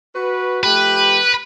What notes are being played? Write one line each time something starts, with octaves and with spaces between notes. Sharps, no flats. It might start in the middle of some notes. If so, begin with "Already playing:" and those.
F#4 B4
F3 A3 G4 B4